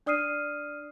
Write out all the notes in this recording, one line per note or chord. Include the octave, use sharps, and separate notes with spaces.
D4 D5 D#6 F6 C7 D#7